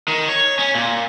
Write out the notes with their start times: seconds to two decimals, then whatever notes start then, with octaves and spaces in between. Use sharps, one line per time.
0.08 D#3
0.29 C#5
0.59 C#4
0.75 A#2